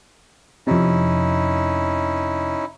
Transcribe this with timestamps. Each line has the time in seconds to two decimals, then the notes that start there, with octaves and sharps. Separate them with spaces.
0.67 F2 C3 C#4 D#4 E4